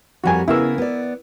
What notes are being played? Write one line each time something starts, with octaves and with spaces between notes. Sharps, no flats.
F2 G3 F#4 A#4 G#5
C#3 B3 E4 G#4 A#4 E6
B3 D5